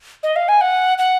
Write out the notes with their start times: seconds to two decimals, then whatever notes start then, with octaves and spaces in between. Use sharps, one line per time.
0.23 D#5
0.36 F5
0.48 G#5
0.61 F#5
0.98 F#5